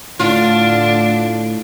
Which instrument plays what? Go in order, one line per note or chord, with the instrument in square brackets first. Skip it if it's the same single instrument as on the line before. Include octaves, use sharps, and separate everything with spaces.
[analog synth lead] A2 [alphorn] D3 [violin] D4 [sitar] F4